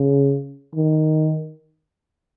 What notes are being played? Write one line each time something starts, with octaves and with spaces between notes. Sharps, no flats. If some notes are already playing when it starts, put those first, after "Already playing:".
Already playing: C#3
D#3